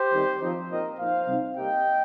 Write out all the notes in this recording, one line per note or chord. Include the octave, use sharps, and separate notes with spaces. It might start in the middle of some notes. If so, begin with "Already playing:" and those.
Already playing: G4 C5
D#3 G3 C4
F3 C4 D#4
A#2 F3 C4 D#4 A#4 D#5
A#2 F3 D#4 C5 F5
C3 G3 C4 D#4
C3 G3 A#3 D#5 G5